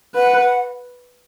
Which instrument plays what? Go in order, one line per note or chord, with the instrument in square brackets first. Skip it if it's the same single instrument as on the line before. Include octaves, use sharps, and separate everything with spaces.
[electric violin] B4 [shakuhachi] F#5